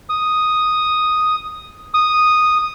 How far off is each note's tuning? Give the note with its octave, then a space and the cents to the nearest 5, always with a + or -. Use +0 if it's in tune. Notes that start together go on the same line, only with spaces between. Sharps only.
D#6 +0
D#6 -5